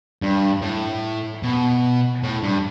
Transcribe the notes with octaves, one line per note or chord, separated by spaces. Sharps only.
G2
A2
B2
A2
G2